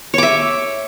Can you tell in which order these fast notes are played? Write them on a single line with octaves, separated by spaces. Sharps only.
C#5 D6 E5